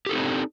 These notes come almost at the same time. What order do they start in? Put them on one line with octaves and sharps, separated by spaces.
G4 A4 D#4 C4 D4